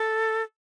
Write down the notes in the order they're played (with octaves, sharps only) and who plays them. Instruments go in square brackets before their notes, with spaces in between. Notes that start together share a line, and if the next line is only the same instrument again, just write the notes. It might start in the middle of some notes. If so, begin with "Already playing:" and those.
Already playing: [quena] A4